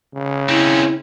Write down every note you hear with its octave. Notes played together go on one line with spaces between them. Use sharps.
C#3
C4 C#4 E4